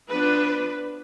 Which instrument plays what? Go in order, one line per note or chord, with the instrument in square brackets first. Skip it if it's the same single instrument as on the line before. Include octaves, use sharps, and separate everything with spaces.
[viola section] F3 B3 D4 B4